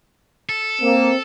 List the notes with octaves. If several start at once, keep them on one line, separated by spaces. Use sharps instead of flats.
A4
A#3 C4